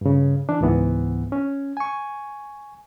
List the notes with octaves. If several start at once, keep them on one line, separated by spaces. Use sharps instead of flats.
G2 C#3
E3 D4
C#2 G#2 E3 B3
C#4
G#5 C#6